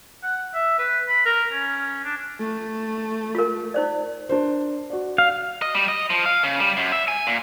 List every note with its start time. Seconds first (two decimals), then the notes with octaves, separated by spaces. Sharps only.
0.23 F#5
0.54 E5
0.78 B4
1.08 B5
1.26 A#4
1.52 C#4
2.04 D4
2.39 A3
3.35 F4 A#4
3.74 D#4 C5 D5
4.29 D4 A#4 C5
4.90 F#4 D5
5.18 F5
5.62 D#5
5.75 G3
5.88 D#5
6.10 F3
6.25 F5
6.43 C#3
6.60 G3
6.77 F#2
6.92 E5
7.08 G#5
7.27 A#2